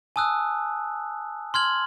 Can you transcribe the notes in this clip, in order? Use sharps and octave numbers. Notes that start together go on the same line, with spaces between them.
G#5 A5 D#6 E6 F#6
C6 F6 G#6 F#7